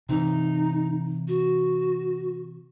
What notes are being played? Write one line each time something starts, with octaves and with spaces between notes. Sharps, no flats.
C3 E3 D#4
F#4